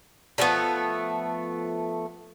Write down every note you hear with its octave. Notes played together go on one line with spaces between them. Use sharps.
D3 F3 A3 B3